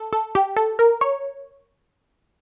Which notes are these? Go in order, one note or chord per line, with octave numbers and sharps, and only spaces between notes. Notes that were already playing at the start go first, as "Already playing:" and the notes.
Already playing: A4
A4
G4
A4
A#4
C#5